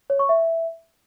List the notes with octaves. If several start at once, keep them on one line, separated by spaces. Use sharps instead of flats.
C#5
C#6
E5